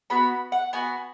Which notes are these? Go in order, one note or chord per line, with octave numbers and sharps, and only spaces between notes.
B3 F#4 B5
F#5
B3 F#4 G#5